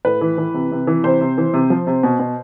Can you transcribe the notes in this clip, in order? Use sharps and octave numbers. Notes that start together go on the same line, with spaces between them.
A2 B4
E3
E3
C3
C3
E3
C3 C5
C3
E3
C3
F3
C3
B2
B2